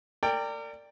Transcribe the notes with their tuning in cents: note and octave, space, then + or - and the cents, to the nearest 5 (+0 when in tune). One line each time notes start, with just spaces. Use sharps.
A#4 -35 D5 +0 G5 +15